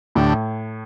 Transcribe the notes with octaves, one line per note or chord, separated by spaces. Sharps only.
D2 A2 D3 A3 D4 G4